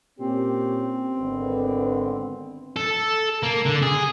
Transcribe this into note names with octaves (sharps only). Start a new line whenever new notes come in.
A#2 C4 C#4 G4
G#1 D3 B3
A4
A#3
D3
G#4